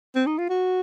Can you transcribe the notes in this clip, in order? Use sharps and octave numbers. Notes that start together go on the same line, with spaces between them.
C4
D#4
F4
F#4